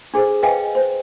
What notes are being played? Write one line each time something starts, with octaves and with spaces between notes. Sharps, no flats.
D4 G#4 A4 C5
B4 D#5 F5 G5 G#5
C5